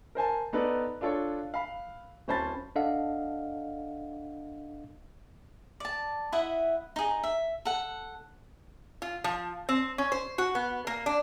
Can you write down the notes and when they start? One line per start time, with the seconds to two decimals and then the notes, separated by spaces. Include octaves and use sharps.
0.15 A#4 C5 G#5 A5
0.53 B3 D#4 A4 B4 D5
1.01 D4 F4 A4 C#5
1.54 F5 B5
2.28 D1 C#4 C5 A5 B5 A6
2.76 D4 A4 D#5 F5 F#5
5.80 D5 A5
6.32 E4 D#5 E5 F#5
6.96 D#4 G#4
7.24 E5
7.65 A4 F#5
9.02 F4
9.24 F3
9.69 C4
9.98 C#4
10.12 C5
10.38 F#4
10.55 B3
10.87 A#3
11.06 D4